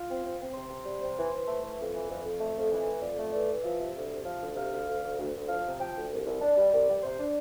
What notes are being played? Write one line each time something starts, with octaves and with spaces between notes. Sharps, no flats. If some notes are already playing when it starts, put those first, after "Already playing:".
Already playing: F4
C4
C4
C4
C3 C5
C3
G3
C3
E3
E3
A3
E3
F2
E3
F2
F2
A3
F2
E3
A3
F2 D5
A3
E3 D5
E3
F3 E5
C3
D2
C3
F3 F5
D2
C3 F5
D2
D2
D2
D2
D2
F3 F5
C3
F3 G5
D2
C2
C2
D4
G3
C2 D5
G3
C3 C5
D4